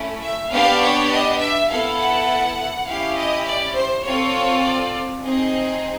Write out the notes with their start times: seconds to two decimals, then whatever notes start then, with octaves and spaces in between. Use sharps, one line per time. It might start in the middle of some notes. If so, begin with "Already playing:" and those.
Already playing: A3 C#4 E4
0.23 E5
0.52 B3 D4 G4 F5
0.82 C#5
1.12 D#5
1.40 E5
1.70 B3 E4 A4 F5
1.99 F#5
2.88 C#4 E4 G4 F5
3.18 D#5
3.46 D5
3.76 C5
4.05 C4 F4 A4 C#5
4.65 D5
5.23 C4 D#4 G#4 D#5